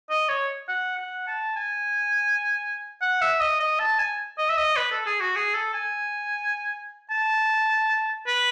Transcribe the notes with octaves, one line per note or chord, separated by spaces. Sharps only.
D#5
C#5
F#5
F#5
A5
G#5
F#5
E5
D#5
D#5
A5
G#5
D#5
E5
D#5
B4
A4
G#4
F#4
G#4
A4
G#5
A5
B4